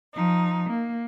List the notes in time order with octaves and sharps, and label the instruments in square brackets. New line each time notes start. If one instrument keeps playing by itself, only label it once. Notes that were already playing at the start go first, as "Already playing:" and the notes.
[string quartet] F3 D#4
A#3